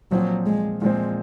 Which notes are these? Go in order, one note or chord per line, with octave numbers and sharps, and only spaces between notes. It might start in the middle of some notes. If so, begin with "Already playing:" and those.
A#2 F3 F#3 C4
G#3
A#2 F3 G#3 C4